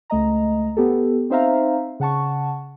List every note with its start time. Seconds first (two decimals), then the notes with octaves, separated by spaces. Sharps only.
0.10 C#2 A3 D#5 A#5
0.77 B3 G4 A4
1.30 C4 D#4 C5 E5 F5 A#5
2.00 C#3 F#5 A5 C#6